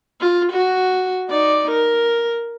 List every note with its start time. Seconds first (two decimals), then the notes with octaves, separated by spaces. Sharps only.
0.21 F4
0.52 F#4
1.29 D#4 D5
1.70 A#4